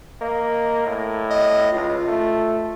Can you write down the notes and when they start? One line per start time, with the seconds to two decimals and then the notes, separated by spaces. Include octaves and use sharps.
0.22 A#3 D#5
0.87 A2
1.30 D#5
1.72 C#2 F4
2.08 A3